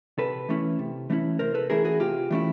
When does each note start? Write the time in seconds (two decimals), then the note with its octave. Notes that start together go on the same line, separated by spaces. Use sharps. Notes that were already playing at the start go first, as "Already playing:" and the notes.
0.18 C3 A4 B4
0.49 E3 A3 C#4 E4
0.79 C3
1.10 E3 A3 C#4 E4
1.39 C3 A#4 C5
1.54 A4 B4
1.70 E3 A3 C#4 E4 G#4 A#4
1.85 F#4 G#4
2.00 C3 F4 G4
2.31 E3 A3 C#4 E4